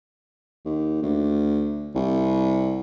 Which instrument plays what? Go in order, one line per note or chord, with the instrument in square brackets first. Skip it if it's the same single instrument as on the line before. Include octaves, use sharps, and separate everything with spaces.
[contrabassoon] D#2
D2
C2